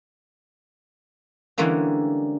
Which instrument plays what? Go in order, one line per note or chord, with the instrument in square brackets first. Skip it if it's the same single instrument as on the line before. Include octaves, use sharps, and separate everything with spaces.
[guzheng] D3 E3 G3 G#3 A#3 C#4